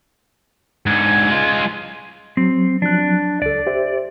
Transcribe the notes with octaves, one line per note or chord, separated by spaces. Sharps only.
G#2 D3 G#6
G#3 F4
F#3 C4
F3 F#3 D4 F#6
C#2 A4 D5
G4 C5 E5